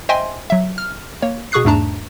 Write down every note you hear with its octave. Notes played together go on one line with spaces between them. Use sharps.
C5 D#5 E5 G5 G#5 C6
F#3 E5
F6
A#3 C#5
B2 G#4 C#6 D#6 F#6 C7
E2 G#2 A3 D4 A5 A#5